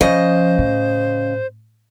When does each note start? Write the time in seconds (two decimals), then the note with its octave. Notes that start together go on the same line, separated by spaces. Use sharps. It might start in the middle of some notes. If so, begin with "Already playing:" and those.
0.01 C#3 F3 C5 D#5
0.58 A2